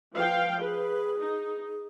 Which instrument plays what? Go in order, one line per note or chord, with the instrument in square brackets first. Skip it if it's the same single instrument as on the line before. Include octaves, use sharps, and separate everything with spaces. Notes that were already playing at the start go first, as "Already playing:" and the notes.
[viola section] F3 F5 G5 [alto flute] B4
[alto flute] G#4 [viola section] B4
[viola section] D#4